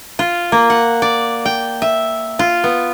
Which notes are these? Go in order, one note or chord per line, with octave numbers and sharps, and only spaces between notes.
F4
A#3
F#5
D5
G5
E5
F4
B3